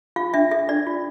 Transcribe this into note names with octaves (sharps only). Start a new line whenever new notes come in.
F4 F5
D4 E5
A4 E5
D4 D5
F4